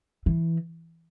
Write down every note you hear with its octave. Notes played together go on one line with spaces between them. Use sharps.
E3